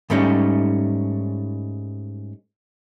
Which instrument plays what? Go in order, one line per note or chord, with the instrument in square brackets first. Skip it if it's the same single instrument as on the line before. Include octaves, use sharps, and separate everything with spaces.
[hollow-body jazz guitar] G#2 G3 A3 C#4 D#4